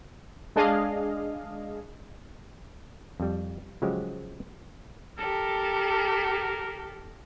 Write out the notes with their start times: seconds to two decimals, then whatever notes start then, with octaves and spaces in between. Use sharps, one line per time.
0.56 G#3 D4 G#4 D#5 F5
3.20 F2 G3
3.82 C#3 F3 F#3 G#3 G4
5.18 G4 A4 A#4